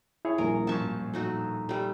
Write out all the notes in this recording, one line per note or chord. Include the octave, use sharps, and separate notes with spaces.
E4 G#4 C#5
D#1 A#1 A#4 G#5
F#2 F3 F#3 A5 C#6
A2
A3 D#4 F#4
G3 A3